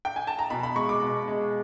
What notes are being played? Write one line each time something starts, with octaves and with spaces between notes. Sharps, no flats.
G5
G#5
A5
A#5
B2 B5
B5
G#3 C#6
D6
B2
G#3